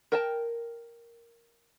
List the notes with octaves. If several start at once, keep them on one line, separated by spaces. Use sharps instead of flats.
A#4 G5 A5